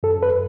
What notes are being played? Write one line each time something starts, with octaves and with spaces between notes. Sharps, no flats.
F#2 A4
B4